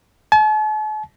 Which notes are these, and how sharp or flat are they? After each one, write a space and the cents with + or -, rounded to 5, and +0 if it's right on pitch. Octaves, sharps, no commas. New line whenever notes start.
A5 -45